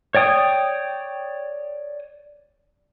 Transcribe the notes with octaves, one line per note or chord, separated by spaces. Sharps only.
C#5 D5 G5 D#6